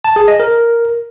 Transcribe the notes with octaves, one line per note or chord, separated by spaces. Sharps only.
A5
G#4
D#5
A#4